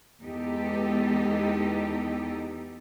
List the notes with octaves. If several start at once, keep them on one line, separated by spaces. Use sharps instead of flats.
E2 G#3 B3 D#4 G4 A4